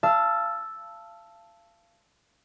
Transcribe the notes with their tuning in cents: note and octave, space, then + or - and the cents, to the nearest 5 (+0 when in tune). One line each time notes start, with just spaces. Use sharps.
F5 -30 A5 +0 E6 +0